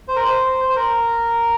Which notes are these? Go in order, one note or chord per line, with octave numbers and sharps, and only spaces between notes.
C5
A#4
C5
C5
A#4